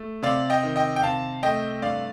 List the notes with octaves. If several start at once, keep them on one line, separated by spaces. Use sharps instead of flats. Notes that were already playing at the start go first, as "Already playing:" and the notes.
Already playing: A3
C3 D5 F5
D#5 G5
D#3
D#5 G5
G5
C3 F5 A5
A3 D#5 G5
G2 D5 F5